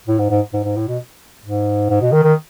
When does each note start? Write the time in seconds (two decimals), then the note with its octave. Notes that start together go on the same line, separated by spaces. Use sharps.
0.08 A2
0.19 G#2
0.30 G#2
0.53 G#2
0.64 G#2
0.76 A2
0.88 B2
1.44 G#2
1.90 G#2
2.02 B2
2.12 D#3
2.23 D#3